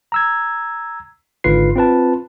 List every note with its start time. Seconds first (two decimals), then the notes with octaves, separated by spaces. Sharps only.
0.12 A#5 E6 G#6
1.44 G#1 G#2 D3 F4 B4 C7
1.76 C4 F4 B4 A5